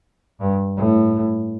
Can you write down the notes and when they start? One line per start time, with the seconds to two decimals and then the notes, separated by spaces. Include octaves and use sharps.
0.40 G2
0.76 A2